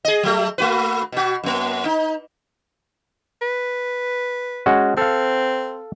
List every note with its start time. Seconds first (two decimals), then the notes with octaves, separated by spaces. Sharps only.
0.05 G#4 D#5
0.23 F#3 A3
0.58 A3 F#4 B4
1.12 B2 F#4
1.44 F#2 A#3
1.85 D#4
3.42 B4
4.66 G#3 C#4 F#4
4.97 C4 A4 F5